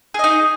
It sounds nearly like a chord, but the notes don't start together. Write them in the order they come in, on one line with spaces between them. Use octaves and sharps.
G#4 D#5 D#4